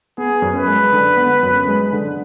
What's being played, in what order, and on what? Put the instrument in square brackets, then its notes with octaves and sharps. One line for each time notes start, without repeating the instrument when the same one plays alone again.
[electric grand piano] B3 [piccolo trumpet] G#4
[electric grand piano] F#2
[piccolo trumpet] B4
[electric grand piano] G#3
D3
B3
F#2
G#3
D3